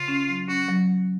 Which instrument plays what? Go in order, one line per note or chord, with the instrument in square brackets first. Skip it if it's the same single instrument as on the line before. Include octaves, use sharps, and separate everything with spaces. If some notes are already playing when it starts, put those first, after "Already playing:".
Already playing: [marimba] C#3 [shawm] F4
[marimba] C#4
F#3
[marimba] C#4 [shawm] F#4
[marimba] F#3